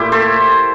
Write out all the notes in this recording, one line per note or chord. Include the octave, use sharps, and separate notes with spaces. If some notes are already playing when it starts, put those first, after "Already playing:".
Already playing: A#2 A3 E4 G4
A4 C5